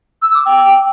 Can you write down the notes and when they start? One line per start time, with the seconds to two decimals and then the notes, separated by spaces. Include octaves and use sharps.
0.22 E6
0.34 D6
0.46 G5